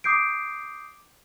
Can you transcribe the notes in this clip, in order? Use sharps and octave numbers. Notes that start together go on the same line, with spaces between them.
D6 D#6 G6 C7 D7